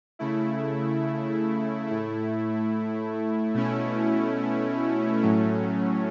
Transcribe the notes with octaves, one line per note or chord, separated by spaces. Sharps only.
C#3 A3 E4
A2 A3 E4
B2 A3 C#4 E4
A2 F#3 A3 C#4